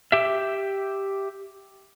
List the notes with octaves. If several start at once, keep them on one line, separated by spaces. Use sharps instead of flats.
G4 E5